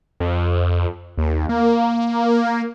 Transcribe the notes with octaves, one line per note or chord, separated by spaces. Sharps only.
F2
D#2
A#3